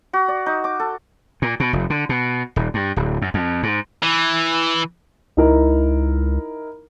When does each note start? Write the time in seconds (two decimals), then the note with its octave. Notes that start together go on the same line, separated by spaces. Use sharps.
0.13 F#4
0.28 D5
0.46 D#4
0.64 D6
0.80 A4
1.42 A#2
1.60 B2
1.73 F1
1.90 D3
2.09 B2
2.56 D#1
2.74 G2
2.96 D1
3.22 F#2
3.34 F2
3.63 G#2
4.03 E3
5.37 C#2 D#4 E4 A#4